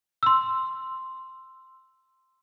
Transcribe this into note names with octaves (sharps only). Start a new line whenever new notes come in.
C6 E6